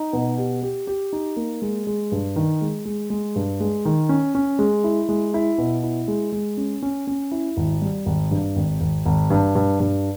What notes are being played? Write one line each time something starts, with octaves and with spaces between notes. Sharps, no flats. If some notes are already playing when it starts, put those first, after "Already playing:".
Already playing: D#4
B2
G4
G4
G4
D#4
A#3
G#3
G#3
G2
D#3
G#3
G#3
G#3
G2
G#3
D#3
C#4
C#4
G#3
E4
G#3
E4
B2
E4
G#3
G#3
C#4
C#4
C#4
E4
G#1
G3
G#1
G2
G#1
G#1
G#1
G2
G2
G2